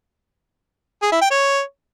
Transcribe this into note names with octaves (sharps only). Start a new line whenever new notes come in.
G#4
E4
G5
C#5